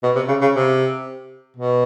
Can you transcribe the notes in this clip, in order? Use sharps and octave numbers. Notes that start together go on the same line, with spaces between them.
B2
C3
C#3
C#3
C3
B2